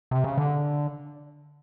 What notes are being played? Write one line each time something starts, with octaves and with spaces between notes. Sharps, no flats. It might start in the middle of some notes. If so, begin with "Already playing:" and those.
C3
C#3
D3